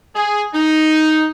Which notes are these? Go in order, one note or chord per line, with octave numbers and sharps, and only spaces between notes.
G#4
D#4